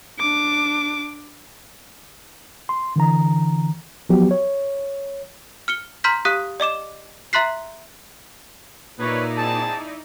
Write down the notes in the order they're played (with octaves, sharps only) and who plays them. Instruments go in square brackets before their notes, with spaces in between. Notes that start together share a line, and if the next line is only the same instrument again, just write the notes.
[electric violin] D4 D6
[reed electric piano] C6
D3 E3 A#5
F3 F#3 B3 F#4 G4
C#5
[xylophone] F6 C#7 G7
A#5 C6 F6 G6 B6
G4 F5 D#6 F#6 B6
D5 D#5 D6 E7
E5 A#5 C6 F#6 B6 C7
[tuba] A#2 [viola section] D#4 E4 D5 [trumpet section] B4 C#5
[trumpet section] C4 G#4 A5